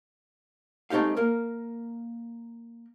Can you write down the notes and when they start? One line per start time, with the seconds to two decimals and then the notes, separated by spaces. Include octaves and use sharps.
0.90 G#3 A3 C4 D#4 G4 F5
1.17 A#3 A#4